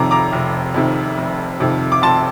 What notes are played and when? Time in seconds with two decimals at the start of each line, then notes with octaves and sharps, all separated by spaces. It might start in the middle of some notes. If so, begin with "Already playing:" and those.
Already playing: F1 F2 C3 D#3 A#5 D6
0.11 A#5 D6
0.33 F1
0.74 F2 C3 D#3
1.18 F1
1.60 F2 C3 D#3
1.92 D6
2.02 F1 A5 C6